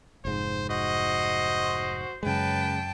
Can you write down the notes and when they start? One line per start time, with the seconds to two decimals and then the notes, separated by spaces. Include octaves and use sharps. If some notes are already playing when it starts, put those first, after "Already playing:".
0.25 F1 G#2 C5
0.70 F#4 C5 D#5
2.23 F#2 C#3 G#3 B4 G5 A5